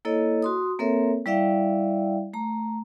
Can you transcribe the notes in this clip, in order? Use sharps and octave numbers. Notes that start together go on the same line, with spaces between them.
A#3 E4 A4 C#5 D#5
F#4 C6 D#6
A#3 C4 A4 A#4 C#5 E5
G3 E4 D5 E5 F5 G5
A3 A#5